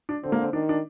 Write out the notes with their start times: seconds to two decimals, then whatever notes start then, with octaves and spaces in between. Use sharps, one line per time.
0.09 D4
0.23 D3 C4
0.32 A#3
0.41 C4
0.53 D#3 D4
0.69 D4